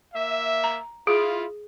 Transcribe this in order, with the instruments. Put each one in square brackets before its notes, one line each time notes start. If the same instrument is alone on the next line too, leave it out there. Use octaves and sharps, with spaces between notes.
[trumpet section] A#3 E5
[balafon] A#5
[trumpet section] E4 F4 [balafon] G#4